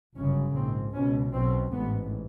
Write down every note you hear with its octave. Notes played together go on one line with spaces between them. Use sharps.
G1 F#2 C#3 C#4
A#1 G#2 C4
C#2 B2 C#4
B1 B2 C4
A1 G#2 B3